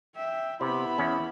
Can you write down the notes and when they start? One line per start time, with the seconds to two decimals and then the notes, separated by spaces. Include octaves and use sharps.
0.16 E5 G5
0.61 C3 B3 E4 B5
0.98 E2 C#4